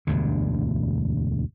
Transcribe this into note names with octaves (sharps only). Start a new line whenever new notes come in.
E1 D2 G2 D3